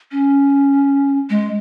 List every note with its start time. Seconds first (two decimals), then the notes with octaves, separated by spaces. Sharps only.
0.12 C#4
1.30 G#3